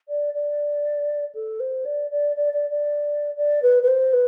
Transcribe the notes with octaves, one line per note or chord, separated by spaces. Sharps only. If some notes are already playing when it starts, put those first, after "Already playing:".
D5
D5
A4
C5
D5
D5
D5
D5
D5
D5
B4
B4
C5
B4